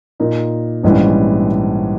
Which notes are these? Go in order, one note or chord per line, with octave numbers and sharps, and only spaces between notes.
A#2 A#3 D#4
A#1 G#2 E3 G3 C#4